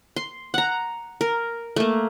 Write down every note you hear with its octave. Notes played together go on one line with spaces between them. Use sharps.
C6
F#5 A#5
A#4
A3 A#3